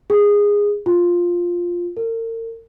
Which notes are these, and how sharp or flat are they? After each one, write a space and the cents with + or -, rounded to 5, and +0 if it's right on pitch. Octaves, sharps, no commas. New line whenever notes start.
G#4 -15
F4 +5
A#4 -40